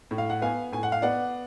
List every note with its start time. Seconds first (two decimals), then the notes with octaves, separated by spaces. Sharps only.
0.11 A2
0.18 F5
0.30 F#5
0.42 B3 F5 G#5
0.72 A2 G#5
0.83 F#5
0.92 F5
1.02 B3 D5 F#5